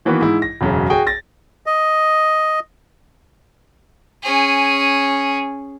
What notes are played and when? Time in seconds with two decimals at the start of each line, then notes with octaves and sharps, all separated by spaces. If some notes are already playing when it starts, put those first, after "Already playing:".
0.05 D#3 E3 A#3 B3 F#4
0.21 G#2 E4
0.42 A#6
0.61 E1 F#2 C#3
0.90 F#4 G#4 G5
1.07 A6 A#6
1.66 D#5
4.23 C#4 G#4